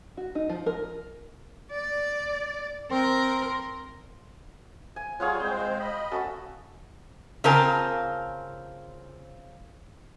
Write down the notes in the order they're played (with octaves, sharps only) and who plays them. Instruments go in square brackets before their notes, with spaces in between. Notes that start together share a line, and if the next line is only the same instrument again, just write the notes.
[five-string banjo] F#4
D#4
F3
A#4
[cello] D5
[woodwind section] C4 [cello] A#4 [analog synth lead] C6
[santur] G#5
[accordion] G3 F4 C#5 [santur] G#4 F5 F#5
[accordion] G#3 C4 C5 [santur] G5
[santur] G5
[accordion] D#5 B5
[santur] C#4 F#4 A4
[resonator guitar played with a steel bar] C#3 C4 F4 A#4 G#5 A5